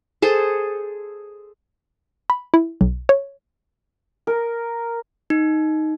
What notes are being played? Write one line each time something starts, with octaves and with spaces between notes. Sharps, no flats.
G#4 A4 C5
B5
E4
B1
C#5
A#4
D#4